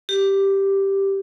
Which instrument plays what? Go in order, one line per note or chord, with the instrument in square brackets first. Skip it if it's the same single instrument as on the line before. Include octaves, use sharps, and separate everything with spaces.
[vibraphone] G4